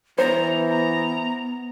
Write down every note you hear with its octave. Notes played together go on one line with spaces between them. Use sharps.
E3 B3 C5 A#5
A#5